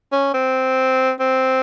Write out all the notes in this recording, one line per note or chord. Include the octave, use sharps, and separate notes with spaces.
C#4
C4
C4